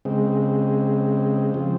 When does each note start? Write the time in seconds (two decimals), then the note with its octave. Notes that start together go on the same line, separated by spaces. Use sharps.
0.05 C#3 G#3 C4
1.54 C#3 F3 C4